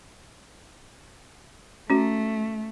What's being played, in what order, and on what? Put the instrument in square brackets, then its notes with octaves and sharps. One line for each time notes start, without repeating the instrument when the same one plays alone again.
[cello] A3 [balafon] C#4 F#4